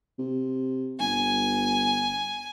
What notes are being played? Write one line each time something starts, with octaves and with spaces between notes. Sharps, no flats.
C3
G1 G#5